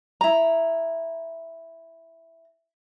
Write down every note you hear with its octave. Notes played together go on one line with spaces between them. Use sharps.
E4 A#5